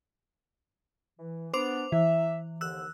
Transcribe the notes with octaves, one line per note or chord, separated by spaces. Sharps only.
E3
B3 D4 C5 D6 F7
E3 E5
D#2 D3 F3 E6 F#6